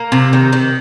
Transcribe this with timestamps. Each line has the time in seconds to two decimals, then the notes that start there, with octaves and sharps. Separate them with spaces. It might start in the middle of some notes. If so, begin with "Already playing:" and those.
Already playing: A#3
0.12 C3
0.33 D#3
0.52 D#3